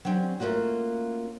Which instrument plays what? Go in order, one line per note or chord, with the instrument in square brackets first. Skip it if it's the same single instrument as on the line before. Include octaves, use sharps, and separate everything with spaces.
[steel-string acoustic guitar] F#3 G3 C4 C#4
A3 A#3 C#4 F4 F#4